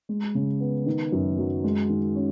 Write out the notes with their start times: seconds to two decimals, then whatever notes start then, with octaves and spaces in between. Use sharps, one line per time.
0.09 G#3
0.35 C#3
0.60 B3
0.86 D#3
1.12 F#2
1.38 F#3
1.64 G#3
1.90 D#3
2.15 C#4